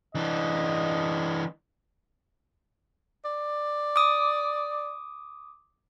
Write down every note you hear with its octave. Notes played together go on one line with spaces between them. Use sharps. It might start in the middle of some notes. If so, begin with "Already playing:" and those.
E3 D4 D#5
D5
D6 D#6